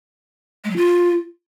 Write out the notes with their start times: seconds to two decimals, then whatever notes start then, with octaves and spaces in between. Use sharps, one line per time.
0.64 G#3
0.70 F#3
0.76 F4